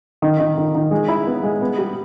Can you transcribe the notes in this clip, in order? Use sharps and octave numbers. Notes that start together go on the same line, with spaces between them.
D#3
D#3
D#3
D#3
G#3
E4
B3
G#3
B3
G3